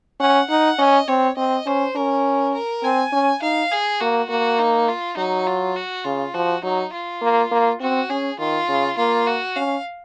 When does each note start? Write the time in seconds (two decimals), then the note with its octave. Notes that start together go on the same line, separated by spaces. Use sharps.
0.20 C#4 F#5
0.50 D#4 F#5
0.78 C#4 D#5
1.08 C4 C#5
1.37 C4 D#5
1.66 C#4 C5
1.95 C#4 A#4
2.54 A#4
2.83 C4 G#5
3.12 C#4
3.42 D#4 F5
3.72 G#4
4.00 A#3 F#4
4.30 A#3 F#4
4.59 D#4
4.89 F4
5.17 F#3 D#4
5.47 F4
5.76 F#4
6.05 C#3 F4
6.34 F3 F#4
6.63 F#3 D#4
6.93 F4
7.22 A#3
7.52 A#3
7.81 C4 F#4
8.10 C#4 G#4
8.39 D#3 F4
8.69 C#3
8.97 A#3 F4
9.27 F#4
9.56 C#4 F5